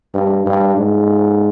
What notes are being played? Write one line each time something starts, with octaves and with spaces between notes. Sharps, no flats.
G2
G2
G#2